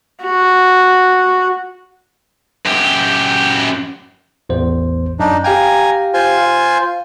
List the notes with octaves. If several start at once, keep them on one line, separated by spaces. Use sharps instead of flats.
F#4
F#2 G4
A1 E2 C5
F#2 D4 D#4
G4 F5 G5 G#5 A#5
F4 C5 G#5
F5